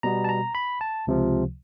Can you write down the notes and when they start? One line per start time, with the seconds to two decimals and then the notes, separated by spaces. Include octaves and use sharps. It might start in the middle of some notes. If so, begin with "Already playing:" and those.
0.03 B2 G3 B3 A#5
0.24 A5
0.29 A#5
0.55 B5
0.81 A5
1.07 C#2 C3 F3